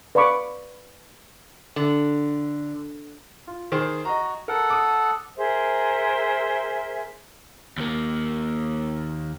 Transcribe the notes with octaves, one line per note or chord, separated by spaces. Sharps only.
B4 D5 F5 B5 C#6 D6
D3
F4
D#3 G#4 C5
F#4 D#5 A#5
A4 A#4 F#5
D6 D#6
G#4 A#4 C5 E5
D#2 A#3